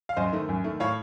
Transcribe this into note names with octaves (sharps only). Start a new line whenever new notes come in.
F5
F#2 C5 D#5
D#3 A3
F#2
D#3 A3
A2 C#5 F5